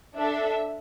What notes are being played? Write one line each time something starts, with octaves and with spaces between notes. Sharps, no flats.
D4 A4 E5